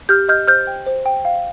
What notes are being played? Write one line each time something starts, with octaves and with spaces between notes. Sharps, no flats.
G4 F6 G6
D#5 F6 G6
C5 F6 G6
G5
C5
G5
F5